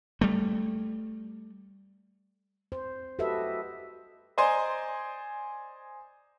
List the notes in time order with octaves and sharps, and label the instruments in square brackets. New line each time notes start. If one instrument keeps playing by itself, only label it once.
[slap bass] G3 A3
[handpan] C5
F#4 G4 A4 B4 D#5 E5
[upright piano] C5 D5 D#5 G#5 A#5 C6